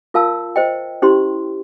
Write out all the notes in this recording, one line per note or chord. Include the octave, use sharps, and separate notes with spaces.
F4 A#4 F5 A5 E6
C5 D#5 G5
C#4 E4 G4 C5 C6